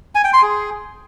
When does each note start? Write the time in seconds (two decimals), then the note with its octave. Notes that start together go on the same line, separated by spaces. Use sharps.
0.15 G#5
0.24 G5
0.33 C6
0.42 G#4